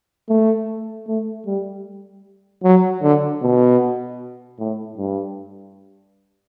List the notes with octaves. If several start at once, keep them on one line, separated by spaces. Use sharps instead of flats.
A3
A3
G3
F#3
D3
B2
A2
G2